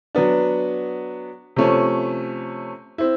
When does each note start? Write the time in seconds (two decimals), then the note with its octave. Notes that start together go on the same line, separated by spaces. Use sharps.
0.15 F#3 B3 D4
1.56 C3 F3 A3 C#4
2.98 C4 E4